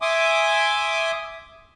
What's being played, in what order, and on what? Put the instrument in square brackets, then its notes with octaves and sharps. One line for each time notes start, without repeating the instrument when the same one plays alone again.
[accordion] E5 G#5 C6 D6 D#6